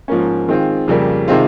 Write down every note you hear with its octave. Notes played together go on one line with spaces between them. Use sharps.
G#2 F3 A#3 C#4
D#3 G#3 C4 F4
F2 C#3 G3 A#3
C3 D#3 G#3 C4 F4